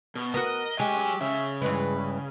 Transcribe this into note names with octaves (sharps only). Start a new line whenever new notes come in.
B2
B3 F#4 A#4 D#5
F#3 G#3 G4 G#5
C#3 E5
G2 E3 G#3 B4